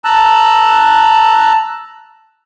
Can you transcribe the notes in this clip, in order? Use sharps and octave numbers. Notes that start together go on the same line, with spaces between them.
A5 A#5 E6 F#6